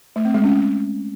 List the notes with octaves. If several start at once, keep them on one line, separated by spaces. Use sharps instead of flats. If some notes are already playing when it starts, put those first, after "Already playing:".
A3
C4
G#3
C#4